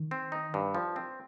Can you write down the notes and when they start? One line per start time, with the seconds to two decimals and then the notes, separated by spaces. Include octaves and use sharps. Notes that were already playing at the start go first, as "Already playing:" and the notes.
Already playing: D#3
0.11 C4
0.32 D#4
0.54 G2
0.75 F3
0.96 C4